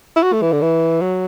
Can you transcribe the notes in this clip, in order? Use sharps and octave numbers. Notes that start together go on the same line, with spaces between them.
E4
F#4
A3
E3
D3
E3
F#3